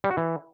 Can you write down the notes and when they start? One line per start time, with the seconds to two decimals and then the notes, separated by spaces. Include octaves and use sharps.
0.04 G3
0.11 F#4
0.17 E3